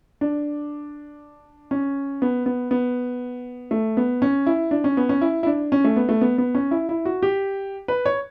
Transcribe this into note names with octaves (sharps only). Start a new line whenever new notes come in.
D4
C#4
B3
B3
B3
A3
B3
C#4
E4
D4
C#4
B3
C#4
E4
E4
D4
C#4
A3
B3
A3
B3
B3
C#4
E4
E4
F#4
G4
B4
C#5